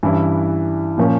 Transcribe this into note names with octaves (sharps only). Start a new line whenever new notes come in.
G2 E3 G3 C#4 E4
A#2 F3 A#3 C#4